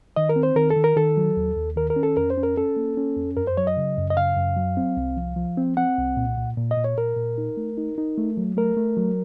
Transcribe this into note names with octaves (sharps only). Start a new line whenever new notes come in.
D#3 D#5
A#4
C4
C5
D#3 A#4
A4
D#3
A#4
D#3 A4
F#3
D#2
D#2
D#3 A#4
A#4
C#4
A4
F2 A#4
C5
C#4
A#4
C#4 A4
A#3
C#4
F2
F#2 A#4
C5
F#3 C#5
D#5
C#3
F#2
D#5
C#3 F5
F#2
F#3
C4
C2
F3
F3
C4
C4 F#5
C2
A#2
A#2
A#2
D#5
A#2
C#5
A#2 A#4
A#2
D#4
A3
D#4
D#4
A3
F#3
A3 A#4
A3
F#3